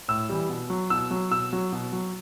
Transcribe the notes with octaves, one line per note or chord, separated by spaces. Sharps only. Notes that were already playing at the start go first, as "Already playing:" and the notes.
A2 E6
E3 G3
B2
F#3
B2 E6
F#3
B2 E6
F#3
B2
F#3